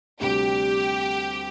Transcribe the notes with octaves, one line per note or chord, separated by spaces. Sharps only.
D2 C3 G3 G4